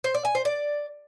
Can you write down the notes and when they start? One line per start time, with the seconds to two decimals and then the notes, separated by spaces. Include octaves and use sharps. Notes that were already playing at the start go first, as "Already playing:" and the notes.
0.04 C5
0.14 D5
0.25 G#5
0.35 C5
0.45 D5